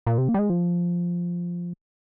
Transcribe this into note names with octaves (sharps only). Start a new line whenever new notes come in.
A#2
C3
A#3
G3
G#3
F3